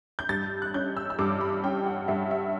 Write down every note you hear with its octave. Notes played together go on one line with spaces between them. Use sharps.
G6
G2 A6
F#6
C#4 G6
E6
E6
G2 D6
B5
C#4 G5
F#5
G2 E5
E5